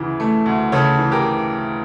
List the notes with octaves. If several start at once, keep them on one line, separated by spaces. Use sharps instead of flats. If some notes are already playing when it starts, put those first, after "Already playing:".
Already playing: D2 C#3 E3
A3
D2
C#3 A4 C#5
E3
G4 A#4